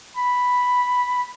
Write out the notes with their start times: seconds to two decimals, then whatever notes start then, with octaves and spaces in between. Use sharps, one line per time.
0.17 B5